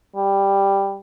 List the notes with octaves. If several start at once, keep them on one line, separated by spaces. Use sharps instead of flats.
G3